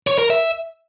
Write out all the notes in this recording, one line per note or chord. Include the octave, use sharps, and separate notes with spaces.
C#5
A#4
E5